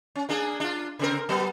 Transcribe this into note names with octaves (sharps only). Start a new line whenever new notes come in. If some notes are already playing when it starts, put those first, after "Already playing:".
C#4
A#3 D4 G#4
D4 F4
C#3 C4 A#4
F#3 B3